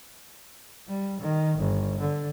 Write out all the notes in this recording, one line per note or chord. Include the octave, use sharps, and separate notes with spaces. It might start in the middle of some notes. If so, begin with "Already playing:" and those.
G3
D#3
G1
D3